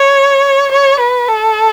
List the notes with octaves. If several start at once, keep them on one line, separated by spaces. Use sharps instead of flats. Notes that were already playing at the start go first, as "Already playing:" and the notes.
Already playing: C#5
C#5
B4
A4